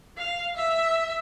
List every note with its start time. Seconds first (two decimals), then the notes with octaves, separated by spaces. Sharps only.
0.17 F5
0.56 E5